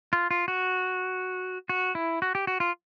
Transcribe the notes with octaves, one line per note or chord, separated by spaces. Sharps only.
F4
F4
F#4
F#4
E4
F#4
G4
F#4
F4